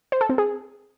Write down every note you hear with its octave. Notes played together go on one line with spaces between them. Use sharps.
C5
A4
C4
G#4